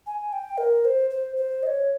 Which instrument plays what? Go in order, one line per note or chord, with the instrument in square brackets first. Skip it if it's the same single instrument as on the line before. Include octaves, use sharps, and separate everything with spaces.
[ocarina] G#5
G5
A#4
C5
C5
C5
D#5
C#5